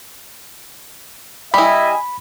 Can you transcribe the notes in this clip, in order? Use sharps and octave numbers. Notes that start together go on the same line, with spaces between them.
G3 E4 D#5 E5 G#5 B5